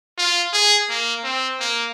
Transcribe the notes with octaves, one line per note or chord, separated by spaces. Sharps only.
F4
G#4
A#3
C4
A#3